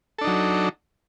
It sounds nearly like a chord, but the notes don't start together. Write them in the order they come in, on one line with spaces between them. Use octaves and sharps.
A4 D4 D#4 F#3